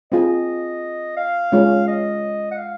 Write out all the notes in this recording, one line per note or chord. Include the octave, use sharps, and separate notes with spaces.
C4 F4 G#4 D#5
F5
G#3 C#4 F4 G#4 C#5
D#5
F#5
F5